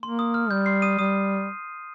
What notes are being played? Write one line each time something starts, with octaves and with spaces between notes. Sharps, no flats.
A#3 C6
D#6
F6
G3 G6
C6 C7
D#6 D#7
G3 D#6 D#7